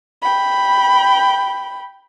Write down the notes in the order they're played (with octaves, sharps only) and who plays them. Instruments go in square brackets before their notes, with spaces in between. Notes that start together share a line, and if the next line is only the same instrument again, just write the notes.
[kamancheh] G5 B5